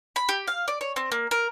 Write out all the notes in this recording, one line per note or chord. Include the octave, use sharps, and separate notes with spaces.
B5
G4
F5
D5
C#5
C4
A#3
A#4